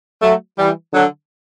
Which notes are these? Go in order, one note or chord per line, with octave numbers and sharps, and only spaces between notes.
F#3 A3
E3 G3
D3 F#3